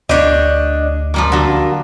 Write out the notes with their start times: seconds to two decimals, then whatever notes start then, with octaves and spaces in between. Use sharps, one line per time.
0.09 D2 D4 G4 C#5 D#5
1.14 F3 G3 A#3
1.32 D3 F#3 A#3